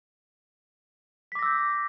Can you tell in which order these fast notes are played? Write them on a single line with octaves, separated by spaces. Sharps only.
B6 D6 A#6 E6 G6